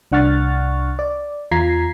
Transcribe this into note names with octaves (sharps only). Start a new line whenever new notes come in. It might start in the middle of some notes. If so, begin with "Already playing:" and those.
C2 D4 F#5 C#6 F6 A6
D5
E2 F4 A#5 G#6 B6 C7